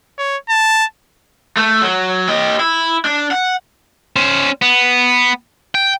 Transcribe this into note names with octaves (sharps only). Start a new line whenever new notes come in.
C#5
A5
A3
F#3
G4 D#5
E4
D4
F#5
C#4 C5
B3
G5